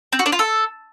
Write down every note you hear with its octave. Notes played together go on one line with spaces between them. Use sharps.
C4
F#4
D4
F4
A4